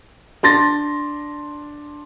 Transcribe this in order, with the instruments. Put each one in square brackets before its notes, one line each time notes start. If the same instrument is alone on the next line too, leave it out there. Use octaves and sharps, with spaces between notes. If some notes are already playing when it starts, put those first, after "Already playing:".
[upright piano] D4 C6 A6 A#6